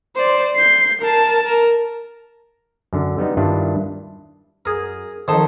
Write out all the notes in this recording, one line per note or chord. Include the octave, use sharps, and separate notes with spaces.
C5 D5
G6 C7
A#4 A5
A#4
F#2 D3
G3 B3 D#4
G2 D#3 D4 E4 F4
F#2 G#4 A#4
F2 D#3 F#3 D#4 A5 C6